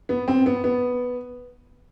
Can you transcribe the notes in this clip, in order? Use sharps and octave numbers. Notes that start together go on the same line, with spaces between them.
B3
C4
B3
B3